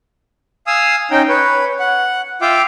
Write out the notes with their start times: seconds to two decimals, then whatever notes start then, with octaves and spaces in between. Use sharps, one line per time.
0.67 F5 G#5 D#6 E6
1.11 C#4 D#4 G5
1.29 B4 C#5
1.79 F#5
2.42 F4 E5 F5 G5 D6